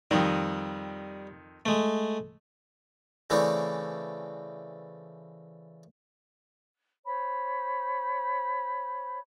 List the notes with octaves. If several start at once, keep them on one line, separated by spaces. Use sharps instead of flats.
F2 D#3 G3
G#3 A3
C#3 E3 A3 C4 D4
C5 C#5 B5